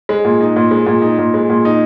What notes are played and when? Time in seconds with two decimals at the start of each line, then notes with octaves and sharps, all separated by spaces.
0.09 G#3
0.25 A#2
0.41 D#4
0.56 A#2
0.71 G#3
0.86 A#2
1.02 D#4
1.18 A#2
1.34 G#3
1.50 A#2
1.65 D#4